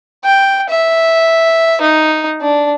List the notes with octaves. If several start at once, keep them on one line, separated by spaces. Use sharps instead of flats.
G5
E5
D#4
D4